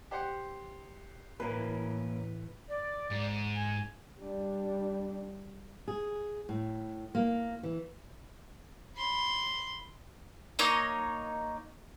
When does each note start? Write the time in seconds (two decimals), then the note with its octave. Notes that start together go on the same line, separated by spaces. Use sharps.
0.11 G4 C5 F#5
1.40 A2 E3 A#3 C#4 A#4 B4
2.69 D5
3.10 G#2
3.55 G#5
4.19 G3 D4
5.88 G#4
6.49 A2
7.15 A#3
7.63 E3
8.96 B5 C6
10.59 A#3 D#4 C#5